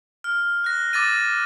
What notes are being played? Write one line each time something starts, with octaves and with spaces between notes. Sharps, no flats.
F6
F#6 A#6
D6 E6 A6 A#6 D#7